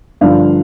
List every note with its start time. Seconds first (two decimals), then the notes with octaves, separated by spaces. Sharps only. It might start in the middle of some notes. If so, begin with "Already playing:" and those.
0.21 G2 D3 F3 D5 F5